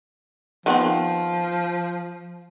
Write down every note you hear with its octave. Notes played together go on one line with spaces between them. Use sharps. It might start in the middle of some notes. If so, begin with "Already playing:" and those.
D#3 F3 B3 C4